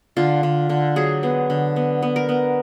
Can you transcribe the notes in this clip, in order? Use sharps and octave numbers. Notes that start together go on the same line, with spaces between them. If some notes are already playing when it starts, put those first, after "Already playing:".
D3 F4
D3
D3
F#3 G#4
B3
D3
B3
B3
A#4
B3